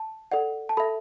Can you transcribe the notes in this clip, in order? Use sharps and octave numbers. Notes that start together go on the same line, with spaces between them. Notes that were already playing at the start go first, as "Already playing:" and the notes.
Already playing: A5
A4 D5 F#5
A5
A4 E5 B5